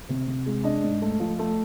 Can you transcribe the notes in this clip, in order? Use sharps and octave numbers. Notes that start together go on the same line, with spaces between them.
C3
C3
G#3
D4 D#5
G#2
A3
F3
A3